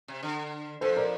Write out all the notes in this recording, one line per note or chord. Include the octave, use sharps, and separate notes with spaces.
C3
D3
F2 F3 A4 C5
A#4 D5